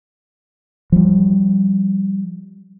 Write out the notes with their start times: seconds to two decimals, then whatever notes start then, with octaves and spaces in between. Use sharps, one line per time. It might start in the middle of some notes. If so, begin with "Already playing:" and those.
0.92 F3 G3